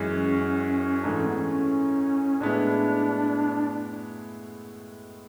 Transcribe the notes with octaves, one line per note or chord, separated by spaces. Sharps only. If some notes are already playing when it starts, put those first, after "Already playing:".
Already playing: F#2 E3 G#3 C#4
G#2 E3 A3 D4
C#4
B3
C#4
A2 G#3 B3 D4 E4